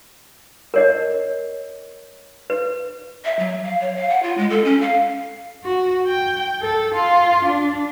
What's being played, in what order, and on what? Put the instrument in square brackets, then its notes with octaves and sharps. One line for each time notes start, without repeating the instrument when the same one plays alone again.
[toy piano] A#4 C#5 D#5
B4
[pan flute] E5
F#3
F5
C#5
F5
F#5
F4
G#3
A4
C#4
F5
[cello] F#4
G5
A4
F4
D4